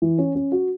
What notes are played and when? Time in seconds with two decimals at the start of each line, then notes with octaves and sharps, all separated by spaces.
0.02 E3
0.18 C#4
0.35 C#4
0.52 F#4